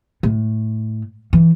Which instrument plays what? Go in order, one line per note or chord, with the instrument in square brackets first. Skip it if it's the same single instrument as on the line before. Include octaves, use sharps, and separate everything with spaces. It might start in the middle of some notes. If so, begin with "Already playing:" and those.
[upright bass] A2
E3